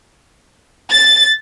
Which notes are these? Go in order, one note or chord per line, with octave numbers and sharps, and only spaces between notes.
A6